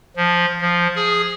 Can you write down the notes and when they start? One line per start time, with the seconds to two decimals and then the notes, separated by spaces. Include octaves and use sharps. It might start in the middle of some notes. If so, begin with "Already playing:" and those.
0.16 F3
0.61 F3
0.95 G#4